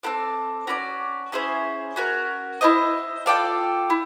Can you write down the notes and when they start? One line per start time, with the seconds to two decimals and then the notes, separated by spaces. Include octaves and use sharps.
0.03 C4 F4 A4 D5
0.67 C#4 F#4 B4 D5
1.32 C#4 E4 G#4 C5
1.96 C#4 F#4 A#4
2.61 E4 G4 C5 D#5
3.26 F4 A4 D5 G5
3.90 E4